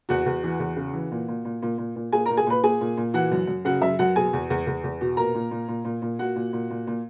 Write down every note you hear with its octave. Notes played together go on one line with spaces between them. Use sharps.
E2 F#4 F#5
E2
E3
E2
C#3
E3
A#2
A#2
A#2
A#2
A#2
A#2
A#2 G#4 G#5
A#4 A#5
A#2
G#4 G#5
A#2 B4 B5
A#2 G#4 G#5
A#2
A#2
E3 F#4 F#5
F#2
F#2
C#3 F#4 F#5
F#2 E5
F#2 F#4 F#5
B2 G#4 G#5
E2
E2
E2
E2
B2
A#2 A#4 A#5
A#2
A#2
A#2
A#2
A#2
A#2 F#4 F#5
A#2
A#2
A#2
A#2